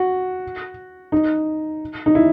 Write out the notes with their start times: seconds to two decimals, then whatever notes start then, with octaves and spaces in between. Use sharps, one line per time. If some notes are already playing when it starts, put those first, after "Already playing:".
Already playing: F#4
1.12 D#4
2.06 D#4
2.15 E4